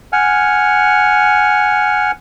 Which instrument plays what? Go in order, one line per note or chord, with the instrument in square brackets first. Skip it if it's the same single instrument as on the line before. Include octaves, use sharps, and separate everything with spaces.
[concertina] F#5 G#5 F6